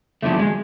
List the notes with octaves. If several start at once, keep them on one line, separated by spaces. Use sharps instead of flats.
E2 D3 F3 A3
G#3